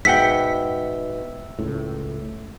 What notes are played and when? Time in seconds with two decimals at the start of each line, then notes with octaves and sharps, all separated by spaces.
0.05 G#2 B2 E5 F#5 G5 B6
1.59 C#2 A2